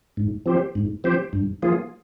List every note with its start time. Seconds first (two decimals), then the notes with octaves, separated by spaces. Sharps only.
0.17 G#2
0.46 F3 C4 G4 C5
0.75 G#2
1.04 F3 C4 G4 C5
1.33 G2
1.62 F3 A#3 F4 G#4